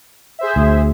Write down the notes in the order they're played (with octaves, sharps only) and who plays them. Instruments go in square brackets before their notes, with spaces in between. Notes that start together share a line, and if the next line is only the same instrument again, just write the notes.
[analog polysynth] G#4 C5 E5
[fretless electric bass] D2